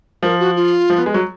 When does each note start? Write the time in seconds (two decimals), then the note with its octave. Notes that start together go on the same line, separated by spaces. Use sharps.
0.23 F3 A#4
0.39 F#4
0.56 F4
0.90 F3
0.98 B3
1.06 G#3
1.14 F#3